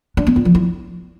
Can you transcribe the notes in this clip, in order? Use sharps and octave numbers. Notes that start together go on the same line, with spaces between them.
D4
B3
F4
F3
E4